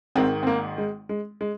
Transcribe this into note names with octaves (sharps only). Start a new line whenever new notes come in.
G#1 G#2 D#3 C4
C4
A#3
G#3
G#3
G#3